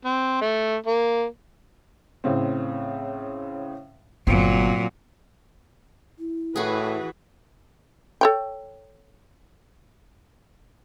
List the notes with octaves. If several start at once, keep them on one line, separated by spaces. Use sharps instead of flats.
C4
A3
A#3
A2 C#3 C4
G1 A#2 F#3 B3 C4
E4
A2 E3 F#4 G#4 B4
A4 C#5 G5